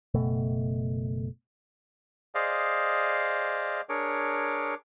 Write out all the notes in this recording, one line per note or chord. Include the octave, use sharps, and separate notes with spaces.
F#1 B2 A3
G#4 C5 D5 D#5 F5
D4 G#4 A#4 C#5 D6